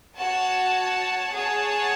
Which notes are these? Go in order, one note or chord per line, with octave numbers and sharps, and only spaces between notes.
F#4 C#5 F#5 A5
G#4 C#5 F#5 A5